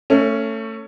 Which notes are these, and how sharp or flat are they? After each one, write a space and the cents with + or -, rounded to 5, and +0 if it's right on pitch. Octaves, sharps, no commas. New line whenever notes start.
A3 +25 C#4 +0